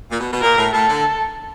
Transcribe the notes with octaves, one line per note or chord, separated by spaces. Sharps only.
A#2
B2
B2
A#2 A#4
A2
A2 A4
D3